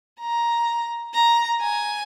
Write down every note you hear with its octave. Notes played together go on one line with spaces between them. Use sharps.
A#5
A#5
G#5